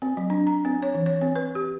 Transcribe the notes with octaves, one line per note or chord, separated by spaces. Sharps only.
C4
F#3
D4
A#5
C4
C#5
E3
C#5
C4
B4
G4